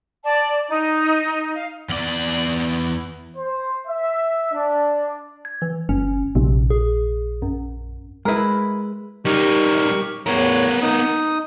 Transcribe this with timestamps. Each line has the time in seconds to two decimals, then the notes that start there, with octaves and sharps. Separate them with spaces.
0.24 D5 A5
0.68 D#4
1.54 F5
1.89 E2 D5
3.37 C5
3.87 E5
4.53 D4
5.45 G#6
5.62 E3
5.89 F#1 C#4
6.35 A#1 C3
6.70 G#4
7.42 F#2
8.25 G#3 E4 A#4 B4
9.25 G3 D#4 G4 A#4 C#6
10.26 E2 A2 B3 A#4 C#5
10.82 D#4 D#6